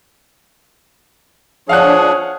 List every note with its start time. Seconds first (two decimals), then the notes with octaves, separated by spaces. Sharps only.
1.69 F3 D4 G#4 C#5 F5 F#5 F#6